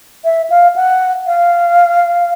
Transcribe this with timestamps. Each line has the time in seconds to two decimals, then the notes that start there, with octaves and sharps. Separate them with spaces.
0.25 E5
0.50 F5
0.76 F#5
1.27 F5